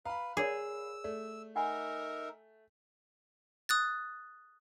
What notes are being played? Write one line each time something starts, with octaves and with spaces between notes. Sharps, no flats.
B4 F5 A#5 B5
G#4 A#4 C#5 D5 E6
A3 D5
D#4 A#4 E5 F#5 G#5 B5
D#6 F#6 A6